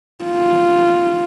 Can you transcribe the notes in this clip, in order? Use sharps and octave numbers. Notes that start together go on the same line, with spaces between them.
F4